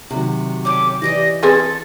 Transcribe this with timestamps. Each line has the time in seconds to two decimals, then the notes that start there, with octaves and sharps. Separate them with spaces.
0.10 C3 D#3 F#3 F#4
0.65 C#4 G4 A4 D6
1.02 E3 G4 D5 D#5 A#6
1.43 C4 G#4 A4 B4 A6